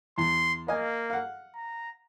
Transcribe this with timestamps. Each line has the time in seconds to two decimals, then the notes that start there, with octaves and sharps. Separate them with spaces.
0.18 E2 C6
0.68 A#3 D#5 F5 G#5
1.10 F5 F#5
1.55 A#5